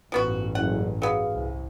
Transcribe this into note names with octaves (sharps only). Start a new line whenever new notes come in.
A1 G2 F3 B3 F#4
F#1 F#5
F#3 B3 G#4 F5
C2